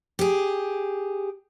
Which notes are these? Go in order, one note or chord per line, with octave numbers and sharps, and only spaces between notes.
G4 G#4